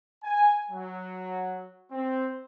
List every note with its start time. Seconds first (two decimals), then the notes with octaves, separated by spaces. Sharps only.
0.24 G#5
0.70 F#3
1.91 C4